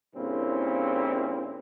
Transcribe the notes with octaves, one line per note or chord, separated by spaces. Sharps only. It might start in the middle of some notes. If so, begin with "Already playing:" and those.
G2 A#2 C#3 C4 C#4 E4